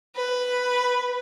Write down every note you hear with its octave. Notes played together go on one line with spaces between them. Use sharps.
B4